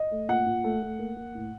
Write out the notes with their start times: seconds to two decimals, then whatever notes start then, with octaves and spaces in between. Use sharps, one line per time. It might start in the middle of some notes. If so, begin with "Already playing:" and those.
Already playing: D#5
0.11 A3
0.29 A#2 F#5
0.46 A#2
0.64 A3
0.82 A3
0.99 A#3
1.16 A#3
1.35 A2